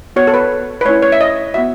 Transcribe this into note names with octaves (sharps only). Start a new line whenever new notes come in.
B3 F#4 C#5
A4
B4
B4
A3 C#4 E4 C#5
C#5
E5
D#5
B3 F#4 E5